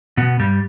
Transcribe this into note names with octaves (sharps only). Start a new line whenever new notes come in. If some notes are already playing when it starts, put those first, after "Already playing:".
B2 B3
G2 G3